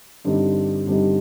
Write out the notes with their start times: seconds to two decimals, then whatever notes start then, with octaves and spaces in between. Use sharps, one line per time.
0.25 G2 D3 G3 C4 D#4
0.86 G2 D3 G3 C4 D#4